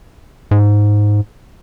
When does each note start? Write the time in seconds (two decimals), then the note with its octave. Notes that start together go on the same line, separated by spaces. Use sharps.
0.51 G#2